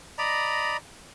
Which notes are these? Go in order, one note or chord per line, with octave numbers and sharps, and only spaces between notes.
D5 D#5 A#5 B5